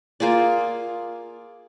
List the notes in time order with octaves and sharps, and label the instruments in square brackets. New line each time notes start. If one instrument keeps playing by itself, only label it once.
[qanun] A#3 F4 G#4 D5